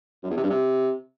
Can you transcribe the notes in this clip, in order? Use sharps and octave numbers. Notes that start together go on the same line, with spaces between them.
F#2
E2
C3
G2
C3